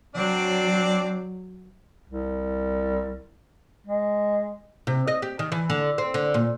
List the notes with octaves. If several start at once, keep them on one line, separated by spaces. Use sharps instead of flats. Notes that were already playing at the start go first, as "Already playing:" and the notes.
F#3 C4 D4 D5
C2
G#3
C3
D#5
G4
D#3
E3
D3
C4
D3
A#2